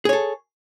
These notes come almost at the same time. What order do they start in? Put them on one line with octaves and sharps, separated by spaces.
G#4 C#5 A4